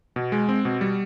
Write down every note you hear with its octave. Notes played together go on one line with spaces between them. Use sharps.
B2
G#3
C4
B2
G3